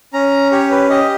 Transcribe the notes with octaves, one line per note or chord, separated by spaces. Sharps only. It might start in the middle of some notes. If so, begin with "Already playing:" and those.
C#4 A#5
G4 C#5
B4
G4 D#5